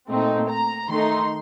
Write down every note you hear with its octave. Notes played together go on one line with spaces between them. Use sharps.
A#2 A3 C4 D#4
A#5
D#3 A3 D#4 C6